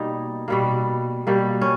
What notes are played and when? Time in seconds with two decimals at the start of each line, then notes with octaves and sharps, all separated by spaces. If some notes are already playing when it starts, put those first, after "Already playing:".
Already playing: B2 G3 A#3 D#4
0.48 B2 G3 A#3
1.27 B2 G3 A#3
1.62 C#4